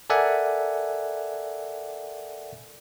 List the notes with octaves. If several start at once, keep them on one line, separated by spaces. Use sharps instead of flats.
A4 A#4 D5 E5 F#5 G#5